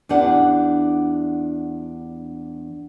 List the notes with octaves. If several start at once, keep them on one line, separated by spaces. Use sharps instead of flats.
E2 B3 D4 G4 F#5